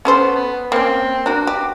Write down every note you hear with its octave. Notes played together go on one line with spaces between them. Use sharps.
B3 C#4 A4 C5
B3
A#3 C4 C#4
D4 F#4 A#4
G4